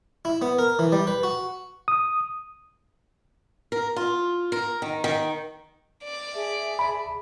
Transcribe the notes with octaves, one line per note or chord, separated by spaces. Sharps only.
E4
B3
A#4
E3
G3
B4
F#4
D#6
A#4
F4
A#4
D#3
D#3
D5
G#4 E5 A5
B5